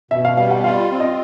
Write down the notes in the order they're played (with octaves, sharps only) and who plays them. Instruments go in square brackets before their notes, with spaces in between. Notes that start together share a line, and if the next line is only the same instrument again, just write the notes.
[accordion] B2 [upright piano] E5
[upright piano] F5
[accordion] G3 [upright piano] F5
[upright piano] F#5
[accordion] F4 [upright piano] F5
[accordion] C4
[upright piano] D#5